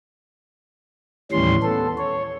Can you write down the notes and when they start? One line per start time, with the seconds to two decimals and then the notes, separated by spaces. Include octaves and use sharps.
1.32 D#2 A2 E3 G3 C#4 C6
1.63 B3 A4
1.98 C#5